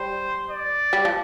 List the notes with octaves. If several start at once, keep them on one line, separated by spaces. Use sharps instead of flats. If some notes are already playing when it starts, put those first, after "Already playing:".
Already playing: G3 C5
D5
G3
F3